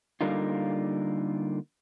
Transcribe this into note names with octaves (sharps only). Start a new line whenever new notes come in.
D3 G3 A#3 D#4 F4